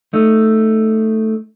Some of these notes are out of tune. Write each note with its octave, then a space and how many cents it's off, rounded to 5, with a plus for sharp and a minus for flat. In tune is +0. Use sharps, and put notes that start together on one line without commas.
A3 +0 D#4 +0